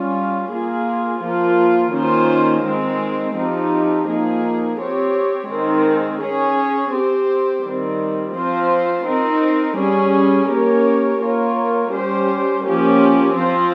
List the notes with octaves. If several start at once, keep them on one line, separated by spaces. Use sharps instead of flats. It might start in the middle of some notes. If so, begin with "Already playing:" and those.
Already playing: G3 C#4 F4
A#3 F4 G#4
F3 A#3 F4
D#3 A#3 C#4 F4 C5
D#3 G#3 C4
F3 C4 D#4 G4
F3 A#3 D#4 G#4
C4 G4 C#5
D#3 G#3 C4
C#4 G#4 C#5
C4 G4 C5
D#3 G3 C4
F3 C4 F4 C5
C4 D#4 A#4
G3 C#4 G#4
A#3 C#4 G4 A#4 C#5
A#3 F4 A#4 C#5
G3 C#4 G4 C5
F3 A#3 C#4 G4
F3 C4 F4 C5